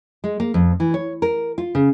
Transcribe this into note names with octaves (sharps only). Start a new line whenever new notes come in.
G#3
A#3
F2
E3
C#5
A#4
F4
C#3